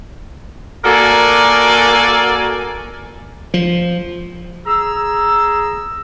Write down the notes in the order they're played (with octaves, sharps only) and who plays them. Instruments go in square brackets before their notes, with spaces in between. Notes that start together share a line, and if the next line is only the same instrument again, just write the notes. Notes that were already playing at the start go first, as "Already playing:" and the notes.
[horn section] A#3 F#4 A4 A#4 D5 G#5
[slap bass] F3
[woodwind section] G#4 A#5 E6